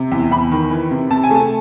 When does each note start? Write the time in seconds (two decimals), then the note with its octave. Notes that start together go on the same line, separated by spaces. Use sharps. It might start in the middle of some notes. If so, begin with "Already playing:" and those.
Already playing: C3
0.12 E2
0.31 E2 B5
0.52 D#3
0.71 E3
0.91 C3
1.11 C3 A5
1.24 G#5
1.31 A3 A5